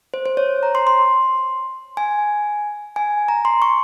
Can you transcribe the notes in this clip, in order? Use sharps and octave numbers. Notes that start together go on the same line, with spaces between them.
C5
C5
C#5
A#5
C6
C6
G#5
G#5
A#5
C6
C#6